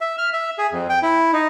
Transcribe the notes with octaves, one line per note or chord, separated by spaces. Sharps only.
E5
F6
E5
G#4
F2
G5
E4
D#4